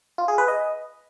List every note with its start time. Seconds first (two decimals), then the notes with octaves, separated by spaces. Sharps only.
0.18 F4
0.28 G#4
0.38 B4
0.48 D#5